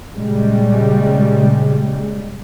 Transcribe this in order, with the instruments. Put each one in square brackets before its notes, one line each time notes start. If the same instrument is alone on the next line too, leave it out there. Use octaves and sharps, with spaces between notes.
[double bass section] A#2 C#3 G3 G#3